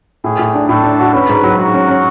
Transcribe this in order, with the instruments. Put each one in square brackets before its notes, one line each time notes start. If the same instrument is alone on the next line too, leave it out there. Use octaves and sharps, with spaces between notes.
[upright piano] A2 [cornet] G#4
[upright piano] A2
D4
[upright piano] A2 [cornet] A4
[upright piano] D4
F#4
[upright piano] C#4 [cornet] B4
[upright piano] G#2
F#3
[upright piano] G#2 [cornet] F#4
[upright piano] C#4
C#4